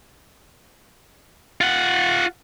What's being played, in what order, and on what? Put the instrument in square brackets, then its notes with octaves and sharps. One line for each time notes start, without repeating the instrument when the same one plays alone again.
[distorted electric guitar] F4 F#5